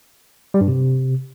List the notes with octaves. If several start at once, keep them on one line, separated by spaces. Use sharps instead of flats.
G3
G2
C3